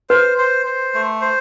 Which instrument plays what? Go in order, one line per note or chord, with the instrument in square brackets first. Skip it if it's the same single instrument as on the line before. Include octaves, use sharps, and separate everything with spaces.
[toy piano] B4 [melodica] C5
[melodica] C5
C5
A3
C5